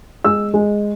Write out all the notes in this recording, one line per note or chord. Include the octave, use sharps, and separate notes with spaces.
G#3 E6
G#3